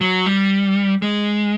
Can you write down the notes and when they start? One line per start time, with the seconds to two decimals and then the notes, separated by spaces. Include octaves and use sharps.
0.01 F#3
0.26 G3
1.02 G#3